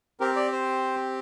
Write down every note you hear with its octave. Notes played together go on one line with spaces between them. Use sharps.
C4 G4 A#4
D5
C5